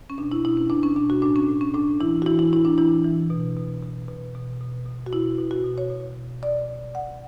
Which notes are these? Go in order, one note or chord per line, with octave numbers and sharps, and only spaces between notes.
C#4
B2 D4
E4
B2 E4
C#4
B2 D4
C#4
B2 D4
F#4
A2 D4
C#4
A2
C#4
A2 D4
E3 E4
F#4
E3 E4
E4
A2 E4
D4
E3 E4
E3
B2
B2
B2
B2
B2
B2
B2
F#4
B2 E4
B2
F#4
B2
C#5
B2
B2
B2 D5
B2
B2 F#5